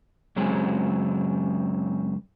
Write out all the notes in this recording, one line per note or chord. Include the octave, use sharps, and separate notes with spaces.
F#2 C#3 F#3 G#3 C4